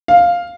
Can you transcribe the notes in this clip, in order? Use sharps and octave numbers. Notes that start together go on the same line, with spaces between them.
F5